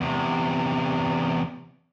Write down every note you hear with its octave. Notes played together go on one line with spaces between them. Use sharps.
E2 C3